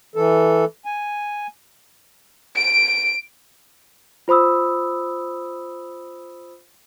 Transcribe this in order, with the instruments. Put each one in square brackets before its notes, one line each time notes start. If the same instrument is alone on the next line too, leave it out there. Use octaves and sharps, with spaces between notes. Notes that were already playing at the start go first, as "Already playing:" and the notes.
[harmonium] E3 A4
G#5
[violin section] D7
[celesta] F4 C5 B5 D#6 E6